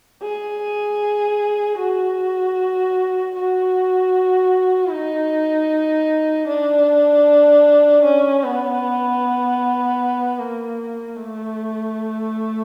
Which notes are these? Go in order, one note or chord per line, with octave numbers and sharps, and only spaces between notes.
G#4
F#4
F#4
D#4
D4
C#4
B3
A#3
A3